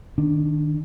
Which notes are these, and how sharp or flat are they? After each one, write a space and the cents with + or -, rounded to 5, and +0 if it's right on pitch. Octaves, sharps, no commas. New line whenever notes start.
D#3 -20 D4 +0